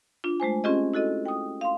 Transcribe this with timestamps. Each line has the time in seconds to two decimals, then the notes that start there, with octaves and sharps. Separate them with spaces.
0.24 D4 F4
0.40 G#3 A3 C5 G#5
0.64 C4 C#4 F4 G4 G#4 D#5
0.94 E4 F#4 A4 D#5
1.26 G5 D#6
1.61 F5 C6